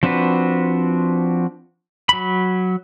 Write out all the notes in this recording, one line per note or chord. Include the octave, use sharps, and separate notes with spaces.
F3 C4 D4 F#4 B4
F#3 B5